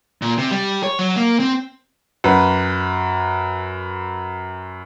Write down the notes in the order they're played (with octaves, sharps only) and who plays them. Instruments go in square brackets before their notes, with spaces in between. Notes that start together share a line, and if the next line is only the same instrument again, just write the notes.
[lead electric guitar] A#2
C3
G3
C#5
F#3
A#3
C4
[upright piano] F#2 B4